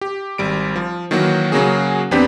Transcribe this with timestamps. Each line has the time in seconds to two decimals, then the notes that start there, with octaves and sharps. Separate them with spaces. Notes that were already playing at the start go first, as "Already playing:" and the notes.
0.01 G4
0.38 G#1 G3 D7
0.76 F3
1.11 D#3 E3 F#3 A#3 F#4
1.52 C#3 F#3 A#3 F#4 G#4
2.11 E2 B3 C4 D4 G4 B6